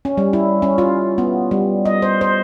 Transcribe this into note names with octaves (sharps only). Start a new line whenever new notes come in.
C#4
G3
E4
C#4
F4
B3
G3
D#5
C5
C5